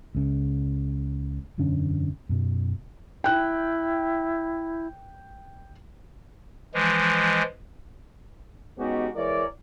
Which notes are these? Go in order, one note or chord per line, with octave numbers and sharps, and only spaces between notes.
C#2 C#3
E1 F#2 D3 C#4
F#2 B2
E4 G5 F#6
E3 F3 G#3
G#3 B3 C#4 D#4 F#4 G4
E3 G#3 A#4 C#5 D5